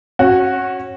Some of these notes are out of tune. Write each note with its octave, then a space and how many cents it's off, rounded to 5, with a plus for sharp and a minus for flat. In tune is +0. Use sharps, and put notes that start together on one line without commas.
C#4 -25 F#4 +0